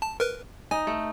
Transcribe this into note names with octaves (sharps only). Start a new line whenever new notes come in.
A5
A#4 B4
D#4 G#5
A3